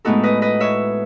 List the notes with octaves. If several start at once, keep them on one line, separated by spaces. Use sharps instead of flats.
A2 G#3 B3 D#4 F#4 A4
B4 D#5
B4 D#5
C#5 E5